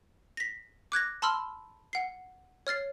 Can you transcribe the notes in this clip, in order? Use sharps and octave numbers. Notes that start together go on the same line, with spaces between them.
A#6 B6
D6 F#6 G#6 A#6
A5 B5 C6 E6 F6
F#5 C7
C#5 F6 A6 C7